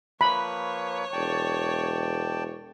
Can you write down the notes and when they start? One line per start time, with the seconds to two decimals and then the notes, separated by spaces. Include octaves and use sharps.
0.21 F3 A#3 B4 C#5 B5
1.13 E1 D5 G5 A5